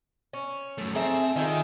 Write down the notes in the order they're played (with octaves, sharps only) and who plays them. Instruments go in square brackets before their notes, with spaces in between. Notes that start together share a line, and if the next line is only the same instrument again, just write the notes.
[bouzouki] C#4
[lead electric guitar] F#2 A3
[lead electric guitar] C4 [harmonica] G#4 A#5 [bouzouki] A4 E5
[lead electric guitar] D#3 [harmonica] F4 G#4 D#5 [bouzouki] E5 G5 G#5